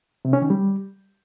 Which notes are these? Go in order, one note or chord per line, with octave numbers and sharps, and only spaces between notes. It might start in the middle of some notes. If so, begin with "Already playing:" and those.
C3
C#4
D#3
G3